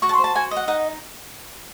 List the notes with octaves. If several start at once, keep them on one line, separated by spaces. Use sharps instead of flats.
F#4 C#6
A5
C6
C5
A5
F#4 G#5
D#5
F#5
D#4 F#5